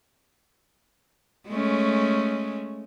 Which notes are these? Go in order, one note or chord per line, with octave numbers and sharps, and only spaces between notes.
G#3 A3 C#4